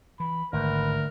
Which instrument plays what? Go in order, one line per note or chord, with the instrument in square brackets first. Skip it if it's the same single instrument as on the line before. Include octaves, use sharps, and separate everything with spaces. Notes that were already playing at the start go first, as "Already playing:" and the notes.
[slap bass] E3 [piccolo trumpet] B5
[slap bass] G#1 [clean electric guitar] D2 [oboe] A#4 [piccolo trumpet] B4